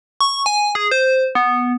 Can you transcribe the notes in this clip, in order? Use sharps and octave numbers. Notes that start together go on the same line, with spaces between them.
C#6
G#5
G#4
C5
B3